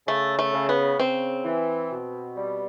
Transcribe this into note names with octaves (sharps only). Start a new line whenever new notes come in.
C#3 A3
A3
C#3
B3
C#3 C4
E3
B2
G3